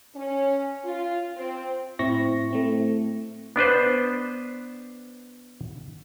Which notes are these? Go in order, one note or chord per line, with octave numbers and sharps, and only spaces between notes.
C#4
F4
C4
A2 C4 E4 C#6 A#6
A3 C4 E4
B3 D4 B4 C5